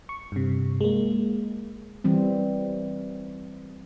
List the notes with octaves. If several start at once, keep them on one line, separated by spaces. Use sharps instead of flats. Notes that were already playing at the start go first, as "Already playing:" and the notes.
C#6
G2 C3
G#3 A#3
E3 G3 C4